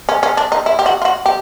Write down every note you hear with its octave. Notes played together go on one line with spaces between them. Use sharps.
C#4
C#4
D4
D#4
E4
G4
F#4
F4
F#4
G4